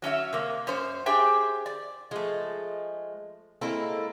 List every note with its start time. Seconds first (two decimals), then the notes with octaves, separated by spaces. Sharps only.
0.02 F#3 C#4 D4 E5
0.33 C3 A#3
0.67 F#2 C#4 C5
1.06 D4 G4 G#4 C5 E5 G5
1.66 D5
2.11 F3 G#3 A3
3.61 G#3 A#3 C4 E4 A4 A#4